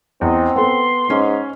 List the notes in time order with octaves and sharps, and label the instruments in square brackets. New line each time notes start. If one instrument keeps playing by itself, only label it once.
[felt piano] E2 [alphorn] C4 [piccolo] D#5
[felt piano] B3 A4 [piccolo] C6
[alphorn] G#2 [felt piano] C#4